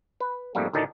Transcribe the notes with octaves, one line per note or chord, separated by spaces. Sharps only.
B4
F2 G#2 G3 A3 A#3
D2 A2 D#3 D#4 D5 A5